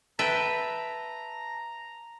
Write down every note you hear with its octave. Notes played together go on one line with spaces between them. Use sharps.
B4 E5 G5 A5 A#5